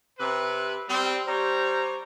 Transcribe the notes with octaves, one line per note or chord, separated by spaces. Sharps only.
C3 B4
G3 C4
G3 C5 C#5 A#5